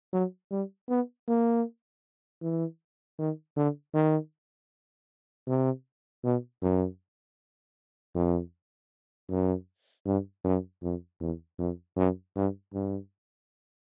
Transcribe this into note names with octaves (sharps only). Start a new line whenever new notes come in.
F#3
G3
B3
A#3
E3
D#3
D3
D#3
C3
B2
F#2
F2
F#2
G2
F#2
F2
E2
F2
F#2
G2
G2